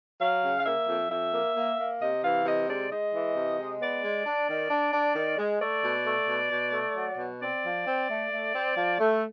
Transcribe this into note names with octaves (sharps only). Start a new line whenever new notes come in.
F#3 F5
C#3
F5
A#3 E5
F2
F2 E5
A#3
A#3
A#3
C3 D#5
E3 F5
C3 D#5
G#3 D5
G#3 D#5
E3
C3
G#3
B3 D5
G#3
D4
D#3
D4
D4
D#3
G#3
A3 D5
B2
A3
B2
B2
A3
F#3
B2
C4 D5
F3
C4
A3
A3
C4
F3
A3